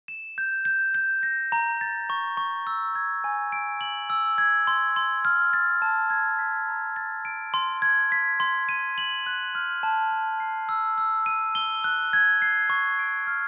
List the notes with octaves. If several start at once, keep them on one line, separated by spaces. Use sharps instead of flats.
E7
G6
G6
G6
A#6
A#5
A6
C#6
C#6
E6
G#6
G#5
D7
F#7
E6
G#6
C6
C6
F6
A6
A5
G#6
B6
A#5
A6
D7
C6
G#6
B6
C6
D#7
F#7
F#6
F6
A5
A5
C7
E6
E6
D#7
G7
F#6
G#6
C7
C#6
D7
F6